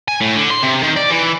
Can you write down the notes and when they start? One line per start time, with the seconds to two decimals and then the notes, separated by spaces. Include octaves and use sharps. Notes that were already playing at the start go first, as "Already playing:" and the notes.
0.08 G#5
0.21 A2
0.36 D3
0.51 C6
0.63 C3
0.83 D#3
0.97 D5
1.10 E3